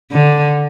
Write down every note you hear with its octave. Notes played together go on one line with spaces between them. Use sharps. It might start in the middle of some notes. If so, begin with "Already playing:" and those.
D3